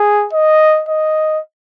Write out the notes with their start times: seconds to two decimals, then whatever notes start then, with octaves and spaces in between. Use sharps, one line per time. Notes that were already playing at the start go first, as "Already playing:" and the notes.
Already playing: G#4
0.33 D#5
0.89 D#5